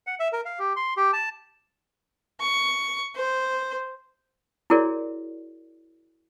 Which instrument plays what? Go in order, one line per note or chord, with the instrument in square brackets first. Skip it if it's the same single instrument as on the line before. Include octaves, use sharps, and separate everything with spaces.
[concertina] F#5
E5
A#4
F5
G4
C6
G4
A5
[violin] C#6
C5
[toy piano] E4 F#4 G#4 A#4 C#5 D5